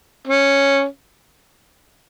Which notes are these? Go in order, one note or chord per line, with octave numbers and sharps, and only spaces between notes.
C#4